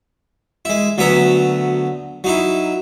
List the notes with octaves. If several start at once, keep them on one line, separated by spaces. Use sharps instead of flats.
G#3 E4
D2 F#3 B3 E5 A#5
F#3 D#4 E4